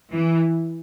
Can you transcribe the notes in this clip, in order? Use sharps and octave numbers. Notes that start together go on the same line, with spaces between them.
E3